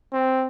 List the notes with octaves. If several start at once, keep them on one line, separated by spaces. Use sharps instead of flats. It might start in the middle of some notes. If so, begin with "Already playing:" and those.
C4